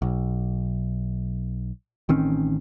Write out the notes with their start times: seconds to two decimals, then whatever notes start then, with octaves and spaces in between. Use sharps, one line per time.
0.02 B1
2.09 A1 D#3 C4 C#4